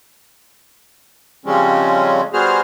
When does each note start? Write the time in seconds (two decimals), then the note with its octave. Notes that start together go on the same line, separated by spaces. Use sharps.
1.46 C#3 F3 G3 G#3 C4 C#4
2.33 G3 B3 F#4 G#4 C5 F6